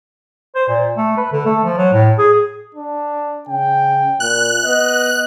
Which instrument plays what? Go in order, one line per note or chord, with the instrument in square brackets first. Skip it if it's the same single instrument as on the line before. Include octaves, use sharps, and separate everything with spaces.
[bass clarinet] C5
A#2
A3
B4
D3
A3
F3
F#3
A2
G#4
[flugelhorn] D4
[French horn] C#3 [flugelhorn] G5
[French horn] A#2 [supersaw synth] F#6
[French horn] B3 [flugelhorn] D#5